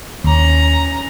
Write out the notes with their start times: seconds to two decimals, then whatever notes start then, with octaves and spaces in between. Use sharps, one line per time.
0.24 D#2 C#4 A#5